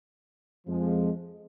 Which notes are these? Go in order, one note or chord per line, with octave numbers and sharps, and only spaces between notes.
F2 F3 G#3